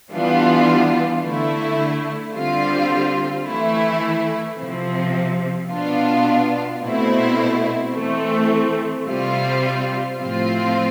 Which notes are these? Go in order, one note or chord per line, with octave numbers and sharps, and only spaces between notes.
E3 G3 B3 D4 F4
D3 A3 E4
D3 G3 C4 F4
E3 A3 E4
C3 F3 C4
B2 B3 D4 F4
B2 A3 C4 E4
E3 A3 C4
C3 G3 C4 F4
A2 F3 C4 F4